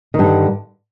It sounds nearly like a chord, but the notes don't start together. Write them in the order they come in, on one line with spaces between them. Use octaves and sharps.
D#3 G2 D3